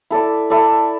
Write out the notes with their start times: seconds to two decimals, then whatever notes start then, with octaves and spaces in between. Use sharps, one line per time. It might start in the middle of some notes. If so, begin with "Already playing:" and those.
0.10 E4 A4 D5
0.50 E4 A4 D5